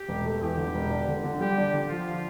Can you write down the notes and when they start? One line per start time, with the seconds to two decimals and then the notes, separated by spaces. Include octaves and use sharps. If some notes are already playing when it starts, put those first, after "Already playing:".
Already playing: G4
0.08 E1
0.25 A3
0.41 E2 G4
0.57 D3
0.75 E1
0.90 D4
1.08 D3
1.24 D3
1.40 G3 G4
1.57 D4
1.73 D3
1.90 F3 F4